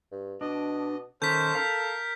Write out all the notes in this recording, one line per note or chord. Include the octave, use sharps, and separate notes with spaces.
G2
B2 D4 D#5
D#3 C#4 A4 A#4 C5 G6 B6
A#4 F5